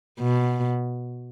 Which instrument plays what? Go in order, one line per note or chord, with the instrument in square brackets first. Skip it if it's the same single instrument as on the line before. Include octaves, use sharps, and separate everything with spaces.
[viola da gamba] B2